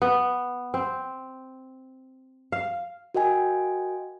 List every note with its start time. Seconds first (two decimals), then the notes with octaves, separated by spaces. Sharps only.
0.02 B3
0.74 C4
2.52 F5
3.15 F#4 A#4 D#5 G5 G#5